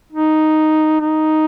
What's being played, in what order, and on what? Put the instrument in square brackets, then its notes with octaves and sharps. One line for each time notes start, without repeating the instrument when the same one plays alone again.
[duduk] D#4
D#4